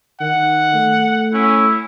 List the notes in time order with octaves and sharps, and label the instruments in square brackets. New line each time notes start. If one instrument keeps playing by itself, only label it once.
[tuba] D#3 [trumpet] F#5
[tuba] A3
[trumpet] C#4 [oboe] E4